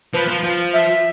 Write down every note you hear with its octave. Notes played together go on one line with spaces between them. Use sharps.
F3 B4
F3
F3
E5